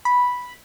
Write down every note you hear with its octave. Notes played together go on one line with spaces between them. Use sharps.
B5